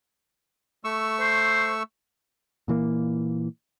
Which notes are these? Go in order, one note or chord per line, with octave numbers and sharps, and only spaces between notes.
A3 C#6 E6
C5
A#2 E3 A#3